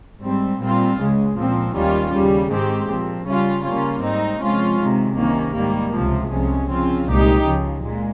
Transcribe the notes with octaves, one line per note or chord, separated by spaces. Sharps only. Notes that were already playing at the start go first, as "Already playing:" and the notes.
G#2 G3 C4
A#2 G3 C4 F4
C#2 C#3 G#3
A#2 F3 C4
D#2 D#3 G3 C#4 F4
D#2 C#3 G3
G#2 D#3 G#3 C4 G4
A#2 F3 C4
C#3 G3 C#4 F4
C#3 G3 A#3 C#4 F4
G#2 G3 C4 D#4
C3 F3 G#3 C#4 F4
C3 D#3 G#3
C2 C3 D#3 A#3 C#4
G#2 D#3 G3 A#3
C#2 C3 F3
C2 C3 F3 G#3 C#4
C#3 F3 C4 F4
C2 A#2 G#3 D#4 G4
C#2 C#3 F3
A#2 G#3